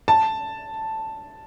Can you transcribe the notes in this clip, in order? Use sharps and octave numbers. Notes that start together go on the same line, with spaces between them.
A5